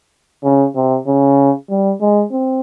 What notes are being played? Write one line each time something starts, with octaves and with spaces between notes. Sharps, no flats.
C#3
C3
C#3
G3
G#3
C4